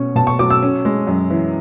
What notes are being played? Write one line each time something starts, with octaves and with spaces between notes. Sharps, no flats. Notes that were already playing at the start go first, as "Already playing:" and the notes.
Already playing: B2 C#4 C#6
B2 A5
C#6
F#3 D6
E6
C#4
G#3
F#2
E3